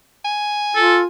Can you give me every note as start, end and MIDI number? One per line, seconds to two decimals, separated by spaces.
0.25 1.07 80
0.75 1.06 65
0.75 0.98 69